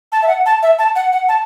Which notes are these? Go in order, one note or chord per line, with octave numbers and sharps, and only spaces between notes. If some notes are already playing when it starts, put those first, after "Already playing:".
A5
E5
F#5
A5
E5
A5
F#5
F#5
A5